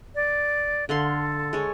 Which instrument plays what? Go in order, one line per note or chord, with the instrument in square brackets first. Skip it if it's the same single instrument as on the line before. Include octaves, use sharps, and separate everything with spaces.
[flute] D5
[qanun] D3 F5 C6 [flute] A4
[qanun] G#3 C#5